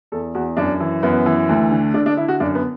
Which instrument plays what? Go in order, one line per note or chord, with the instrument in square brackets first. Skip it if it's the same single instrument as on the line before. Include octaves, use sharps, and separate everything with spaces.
[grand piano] E2 A4
E2 F#4
F#2 D4
E3
F#2 B3
E3
D2
D3
D3 D4
D4
D3 E4
F#4
F#2 D4
B3